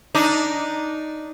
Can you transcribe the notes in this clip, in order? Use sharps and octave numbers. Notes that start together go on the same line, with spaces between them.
D4 D#4